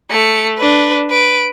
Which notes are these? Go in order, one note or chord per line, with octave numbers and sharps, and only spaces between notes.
A3 C#7
D4 B4
B4 D7